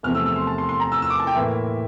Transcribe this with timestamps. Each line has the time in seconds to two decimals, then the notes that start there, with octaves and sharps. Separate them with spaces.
0.03 E2 C3 F3 A3 F6
0.15 E6
0.26 E6
0.36 C6
0.47 A5
0.58 C6
0.69 C6
0.80 A#5
0.92 E6
1.02 E6
1.10 D6
1.20 A5
1.27 G5
1.35 A2 E3 A#3 E4 E5